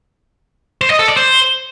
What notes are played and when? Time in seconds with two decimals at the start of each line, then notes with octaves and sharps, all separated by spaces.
0.81 C5
0.90 D#5
0.99 A4
1.08 D5
1.17 C5